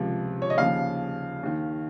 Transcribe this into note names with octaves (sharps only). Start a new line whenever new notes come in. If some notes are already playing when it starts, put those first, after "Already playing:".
Already playing: C#2 C3 F3
C#5
D#5
D#2 C#3 F3 F5
D#2 D#3